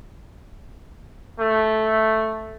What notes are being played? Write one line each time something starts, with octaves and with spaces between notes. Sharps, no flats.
A3